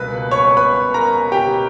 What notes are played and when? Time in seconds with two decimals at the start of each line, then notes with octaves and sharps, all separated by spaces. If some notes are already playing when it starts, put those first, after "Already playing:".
Already playing: C#2 B2 G3 A#3 B4 B5
0.31 C#5 C#6
0.57 B4 B5
0.94 A#4 A#5
1.32 G4 G5